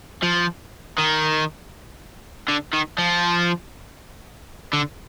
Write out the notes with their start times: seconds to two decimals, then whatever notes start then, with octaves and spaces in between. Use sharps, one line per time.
0.23 F3
0.98 D#3
2.48 D3
2.73 D#3
2.98 F3
4.73 D3